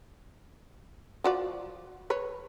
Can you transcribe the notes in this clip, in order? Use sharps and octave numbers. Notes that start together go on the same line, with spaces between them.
F3 F#4 D5
B4 C#5